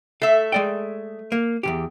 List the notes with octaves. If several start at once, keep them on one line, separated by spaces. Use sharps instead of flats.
A3 E5 F5
G#3 D5 G5
A#3
E2 C3 G4